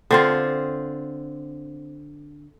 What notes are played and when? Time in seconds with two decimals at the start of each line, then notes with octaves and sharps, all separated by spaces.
0.11 D3 C4 F4